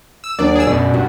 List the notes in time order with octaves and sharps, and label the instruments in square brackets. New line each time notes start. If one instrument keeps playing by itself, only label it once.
[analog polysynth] E6
[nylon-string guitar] D#2 F#3 D4 [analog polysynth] D5
[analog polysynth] G#4 E6
[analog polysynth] F#2 B2 [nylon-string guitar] D5
[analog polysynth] G2 [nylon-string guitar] F#4